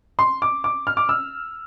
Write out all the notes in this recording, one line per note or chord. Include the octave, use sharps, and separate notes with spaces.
C6
D6
D6
F6
D6
E6